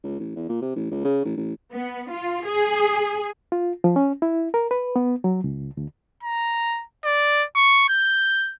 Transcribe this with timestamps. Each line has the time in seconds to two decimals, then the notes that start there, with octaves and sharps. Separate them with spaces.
0.03 C#2
0.19 A1
0.36 E2
0.49 A#2
0.62 C3
0.76 A1
0.91 C#2
1.04 C#3
1.25 A1
1.37 A1
1.73 B3
2.11 F4
2.46 G#4
3.52 F4
3.84 F3
3.96 C#4
4.22 E4
4.54 A#4
4.71 B4
4.96 B3
5.24 F#3
5.44 C#2
5.77 D2
6.23 A#5
7.05 D5
7.55 C#6
7.89 G6